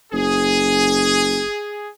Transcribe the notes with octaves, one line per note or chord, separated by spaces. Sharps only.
F#1 G#4